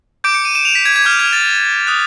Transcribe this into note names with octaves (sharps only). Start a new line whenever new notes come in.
D6 G6 D7
C#7
D#7
E7
F7
B6
G#6
G#6
D6 F6 G6
G#6
A6
D#6 F#6